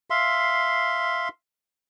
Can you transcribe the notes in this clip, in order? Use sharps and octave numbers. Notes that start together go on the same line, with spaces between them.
E5 F5 C6